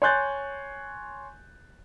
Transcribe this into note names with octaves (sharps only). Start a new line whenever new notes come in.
C#5 G#5 C6 F#6 G6 A6